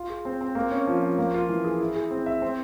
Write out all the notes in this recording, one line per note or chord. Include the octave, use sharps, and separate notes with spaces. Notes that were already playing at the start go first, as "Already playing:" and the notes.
Already playing: F4
G#4
C4
C4
A#3
C#4
F3
F3
A#3
F4
E3
G#4
E4
G#4
C4
E5
C4